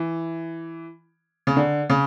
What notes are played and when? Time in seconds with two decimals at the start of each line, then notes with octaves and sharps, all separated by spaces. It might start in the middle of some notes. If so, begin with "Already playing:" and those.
Already playing: E3
1.47 C#3
1.56 D3
1.90 C#3